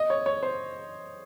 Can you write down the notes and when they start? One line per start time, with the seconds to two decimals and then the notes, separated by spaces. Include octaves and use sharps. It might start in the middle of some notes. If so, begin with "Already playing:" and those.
Already playing: D#5
0.10 C#5
0.26 C#5
0.43 C5